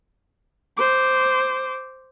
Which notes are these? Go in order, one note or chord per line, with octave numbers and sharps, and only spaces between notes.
C5 D6